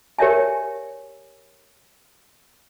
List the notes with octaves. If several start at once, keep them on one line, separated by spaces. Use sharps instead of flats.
G4 A#4 C#5 D5 E5 G#5